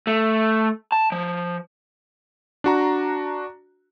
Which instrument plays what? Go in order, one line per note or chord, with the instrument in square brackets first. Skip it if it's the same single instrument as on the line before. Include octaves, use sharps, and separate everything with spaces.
[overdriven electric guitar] A3
A5
F3
[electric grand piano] D4 F#4 A#5